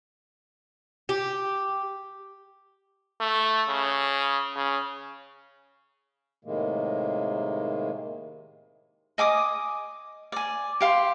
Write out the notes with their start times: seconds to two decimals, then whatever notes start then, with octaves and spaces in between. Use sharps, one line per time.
1.09 G4
3.21 A3
3.69 C#3
4.56 C#3
6.45 A2 C3 D#3 G#3 A#3
9.18 D#5 G#5 D6 D#6
10.32 D5 G#5
10.81 G4 F5 C6